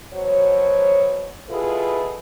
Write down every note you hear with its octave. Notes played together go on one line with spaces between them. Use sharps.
B2 F#3 C5 C#5
B2 E4 F4 G#4 A4 B4